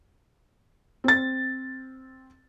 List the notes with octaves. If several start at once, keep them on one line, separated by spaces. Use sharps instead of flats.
C4 A6